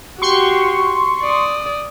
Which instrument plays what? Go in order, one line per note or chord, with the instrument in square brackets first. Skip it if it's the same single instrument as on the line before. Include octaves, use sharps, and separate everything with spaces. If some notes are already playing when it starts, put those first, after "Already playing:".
[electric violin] F#4 G4 [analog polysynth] C6 C#6
[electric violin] D5 D#6